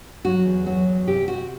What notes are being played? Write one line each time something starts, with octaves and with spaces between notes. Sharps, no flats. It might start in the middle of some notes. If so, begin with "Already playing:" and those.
F#3 F#4
E2
F#3 F#4
E2
C3 G4
C3 F#4